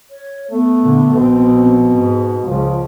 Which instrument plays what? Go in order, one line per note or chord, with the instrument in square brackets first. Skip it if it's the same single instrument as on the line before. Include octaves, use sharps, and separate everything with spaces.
[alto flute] C#5
[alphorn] A3 [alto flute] B3
[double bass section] A#2 D3
[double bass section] A#1 C4 [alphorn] B2
[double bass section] G#2
[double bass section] C#2 C#3 [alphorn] F3